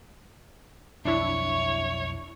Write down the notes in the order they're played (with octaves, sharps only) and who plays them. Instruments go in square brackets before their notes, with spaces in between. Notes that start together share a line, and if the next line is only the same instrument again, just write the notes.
[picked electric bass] B1 F2 [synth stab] D4 E4 [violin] C#5 [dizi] E5